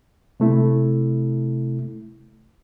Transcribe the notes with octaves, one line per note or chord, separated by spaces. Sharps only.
C3 A3 E4